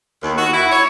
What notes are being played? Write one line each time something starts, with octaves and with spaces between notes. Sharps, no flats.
D#2
F#4
E4
C#5